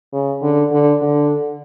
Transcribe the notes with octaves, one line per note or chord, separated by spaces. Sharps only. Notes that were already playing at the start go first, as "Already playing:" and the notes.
C#3
D3
D3
D3